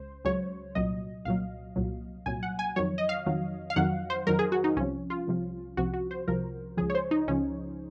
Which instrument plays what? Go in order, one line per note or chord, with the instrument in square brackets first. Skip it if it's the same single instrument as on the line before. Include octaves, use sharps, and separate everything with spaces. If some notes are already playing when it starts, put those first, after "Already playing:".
Already playing: [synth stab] C#2 C5
C#2 C#3 F#3 C#5
C2 A#2 F#3 D#5
C2 A#2 F#3 F5
C2 A#2 F#3
C2 A#2 F#3 G#5
F#5
G#5
F2 D#3 F#3 C#5
D#5
F5
F2 D#3 F#3
F5
F2 D#3 F#3 F#5
C5
F2 D#3 F#3 A#4
G#4
F#4
D#4
C2 C3 F3 C#4
F4
C2 C3 F3
C2 C3 F3 F#4
F#4
C5
C2 C3 F3 A#4
C#2 C#3 F3 G#4
C#5
C5
D#4
C#2 C#3 F3 C#4